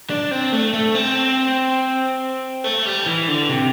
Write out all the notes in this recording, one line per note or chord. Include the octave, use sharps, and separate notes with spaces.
D4
C4
A3
A3
C4
A3
G3
E3
D3
C3